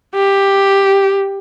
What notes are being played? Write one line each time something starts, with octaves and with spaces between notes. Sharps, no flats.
G4